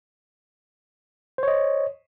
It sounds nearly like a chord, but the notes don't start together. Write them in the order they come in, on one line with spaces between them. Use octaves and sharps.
C5 C#5 D#5